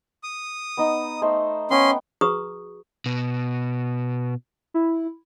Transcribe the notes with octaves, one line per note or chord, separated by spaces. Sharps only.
D#6
B3 D#4
A3 D#4 C5
B3 C#4 G5 C6
F#4 G#4 B4 A#5 C#6 D#6
B2
E4